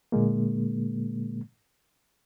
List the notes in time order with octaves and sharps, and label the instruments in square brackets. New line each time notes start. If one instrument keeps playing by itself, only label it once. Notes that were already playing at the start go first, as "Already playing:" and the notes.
[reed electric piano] A#2 D3 G#3 A#3